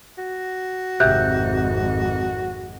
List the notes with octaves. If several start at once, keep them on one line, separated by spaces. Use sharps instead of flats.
F#4
G#1 F2 C3 F#6 G6